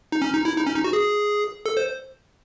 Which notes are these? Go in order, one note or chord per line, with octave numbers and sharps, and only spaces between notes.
D#4
C#4
D#4
E4
D#4
C#4
D#4
F#4
G#4
A4
C5